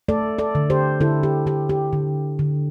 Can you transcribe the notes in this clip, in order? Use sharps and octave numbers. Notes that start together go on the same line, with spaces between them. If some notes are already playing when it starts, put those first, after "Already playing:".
A3 A4 D5
A4 D5
D3
G4 C5
D3 E4 A4
G4
D3 G4
G4
D3
D3